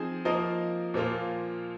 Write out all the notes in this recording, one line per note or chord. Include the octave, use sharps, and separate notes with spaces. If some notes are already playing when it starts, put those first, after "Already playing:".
Already playing: F3 C4 D#4 G#4
F3 A#3 F4 A#4 D#5
A#2 F3 A#3 F4